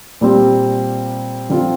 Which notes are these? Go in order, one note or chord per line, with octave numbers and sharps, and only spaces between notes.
A#2 G3 C4
D3 F3 C4 F4